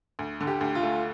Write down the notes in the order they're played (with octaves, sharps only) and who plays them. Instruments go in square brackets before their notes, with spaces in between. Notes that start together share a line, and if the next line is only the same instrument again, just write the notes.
[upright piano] D2
D3
[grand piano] G4
[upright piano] D2
[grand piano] F4
[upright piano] A3